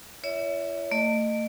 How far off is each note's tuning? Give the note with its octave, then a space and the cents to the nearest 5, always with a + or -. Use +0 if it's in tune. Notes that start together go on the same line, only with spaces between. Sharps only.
E4 +40 C#5 +35 E5 -15
A3 +35 D#5 -25